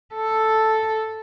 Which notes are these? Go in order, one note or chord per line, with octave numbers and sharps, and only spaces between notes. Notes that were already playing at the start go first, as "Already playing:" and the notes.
A4